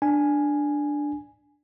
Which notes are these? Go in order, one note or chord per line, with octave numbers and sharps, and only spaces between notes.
D4 G#5